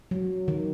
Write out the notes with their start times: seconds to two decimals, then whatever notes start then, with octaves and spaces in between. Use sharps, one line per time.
0.11 F#3
0.48 D#3